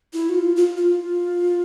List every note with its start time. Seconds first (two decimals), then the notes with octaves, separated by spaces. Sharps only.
0.13 E4
0.29 F#4
0.35 F4
0.56 F4
0.77 F4